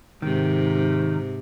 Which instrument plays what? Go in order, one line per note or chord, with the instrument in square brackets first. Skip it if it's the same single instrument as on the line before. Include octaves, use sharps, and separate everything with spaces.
[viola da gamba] G#2 C3 [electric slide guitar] D#3